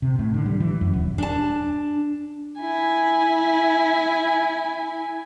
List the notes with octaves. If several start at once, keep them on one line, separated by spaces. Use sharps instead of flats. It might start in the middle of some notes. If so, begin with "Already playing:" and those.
C3
A2
D3
G3
E3
F#2
D#1
D4 A5
E4 G#5